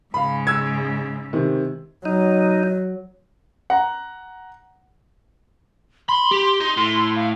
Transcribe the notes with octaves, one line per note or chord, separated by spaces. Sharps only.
G#2 C#3 F5 B5
E6 G#6
C3 D#3
F#3 D#4
F#5 A#5
B5 C6
G4
D#4
A2
F5